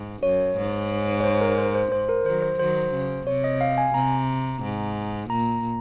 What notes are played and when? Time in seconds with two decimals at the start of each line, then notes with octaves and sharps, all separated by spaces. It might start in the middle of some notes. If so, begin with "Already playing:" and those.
Already playing: G#2
0.23 F#2 C#5
0.57 G#2
1.20 C#5
1.24 C5
1.41 A#4
1.58 C5
1.75 C5
1.92 G#2 C5
2.09 A#4
2.26 D#3 F#3 C5
2.42 C5
2.59 D#3 F#3 C5
2.94 C#3
3.27 C3 C#5
3.44 D#5
3.61 F5
3.78 G#5
3.94 C3 A#5
4.63 G#2
5.30 A#2 A#5